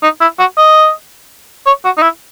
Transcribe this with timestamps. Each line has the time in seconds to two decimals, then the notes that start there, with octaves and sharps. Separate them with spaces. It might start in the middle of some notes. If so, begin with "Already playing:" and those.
0.03 D#4
0.21 E4
0.39 F#4
0.58 D#5
1.66 C#5
1.85 F#4
1.97 D#4
2.02 E4